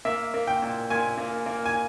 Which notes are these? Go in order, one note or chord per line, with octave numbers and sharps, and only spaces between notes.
A#3 E5
A#3
G5
A#2
A#2 G#5
A#3
A#3
G#5